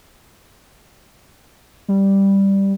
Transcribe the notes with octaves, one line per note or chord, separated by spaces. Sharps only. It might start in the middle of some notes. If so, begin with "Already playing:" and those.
G3